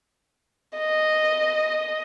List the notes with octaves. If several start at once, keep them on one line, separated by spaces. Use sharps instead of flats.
D#5